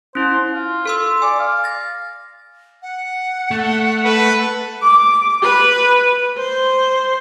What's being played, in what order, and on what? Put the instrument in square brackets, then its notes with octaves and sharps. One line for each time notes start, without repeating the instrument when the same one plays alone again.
[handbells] C#4 E4 [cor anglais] C5
[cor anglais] F4
[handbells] A4 C6 E6
[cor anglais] D5 [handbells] G#5
[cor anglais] F5
[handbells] A6 A#6
[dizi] F#5
[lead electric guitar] A3
[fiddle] A4 [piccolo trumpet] B4
[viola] D6
B4
C5